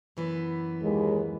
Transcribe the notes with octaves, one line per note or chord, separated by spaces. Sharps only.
F#2 E3 B3
D#2 G#3